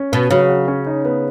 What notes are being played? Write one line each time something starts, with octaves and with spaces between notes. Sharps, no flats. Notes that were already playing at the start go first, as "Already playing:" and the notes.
Already playing: C#4
B2 B4
C#3 F#3
F#4
C#4
D#4
B3